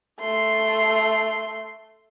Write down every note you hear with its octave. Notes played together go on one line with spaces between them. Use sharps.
A3 C6